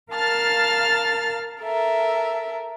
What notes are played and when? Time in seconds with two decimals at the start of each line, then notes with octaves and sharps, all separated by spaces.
0.11 A#4 F5 A5 F6 A6
1.61 A4 A#4 E5